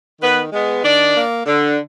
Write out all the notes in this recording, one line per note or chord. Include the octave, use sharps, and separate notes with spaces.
D#3 B3 B4
G#3 B3
D#3 D4 D5
A#3
D3